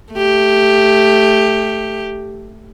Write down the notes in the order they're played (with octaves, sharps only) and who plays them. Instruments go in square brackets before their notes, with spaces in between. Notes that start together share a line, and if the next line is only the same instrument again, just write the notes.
[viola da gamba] A3 G4